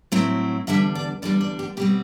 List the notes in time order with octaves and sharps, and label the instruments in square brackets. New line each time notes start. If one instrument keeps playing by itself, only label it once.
[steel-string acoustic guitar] A2 F#3 C4 E4
E2 D3 G3 D4 E5
D5
E2 D3 G3 D4 D5
D5
G4
B2 G3 C4 G4